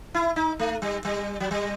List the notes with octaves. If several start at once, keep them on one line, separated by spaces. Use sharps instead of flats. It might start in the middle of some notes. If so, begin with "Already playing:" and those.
E4
D#4
A3
G3
G3
F#3
G3